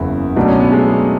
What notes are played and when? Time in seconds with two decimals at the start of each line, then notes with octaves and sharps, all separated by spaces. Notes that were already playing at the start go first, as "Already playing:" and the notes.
Already playing: F#1 E2 C#3 E4
0.36 B1 B2 A3 D4
0.48 C#4
0.60 B3
0.72 G#3